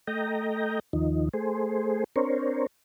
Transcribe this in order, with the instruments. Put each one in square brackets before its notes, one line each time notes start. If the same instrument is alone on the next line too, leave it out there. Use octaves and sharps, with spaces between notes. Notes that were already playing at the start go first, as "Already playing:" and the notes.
[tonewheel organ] A3 D#5 G5 A#5
D#2 D#3 F3 D#4
A3 G#4 C5
C4 D4 A#4 C5 C#5